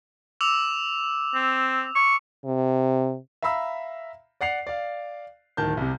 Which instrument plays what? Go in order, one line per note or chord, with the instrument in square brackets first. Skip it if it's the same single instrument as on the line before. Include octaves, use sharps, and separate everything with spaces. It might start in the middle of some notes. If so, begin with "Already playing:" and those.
[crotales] D6 E6 F7
[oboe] C4
C#6
[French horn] C3
[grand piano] E5 F5 A#5 B5 E6
D5 F#5 C7 F7
D5 F5
D1 D#3 A5 G6
C2 C3